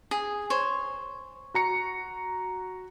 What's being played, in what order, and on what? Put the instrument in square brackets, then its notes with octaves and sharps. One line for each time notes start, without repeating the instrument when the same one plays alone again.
[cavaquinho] G#4
C5 C#5
[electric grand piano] F#4 A#5 C#7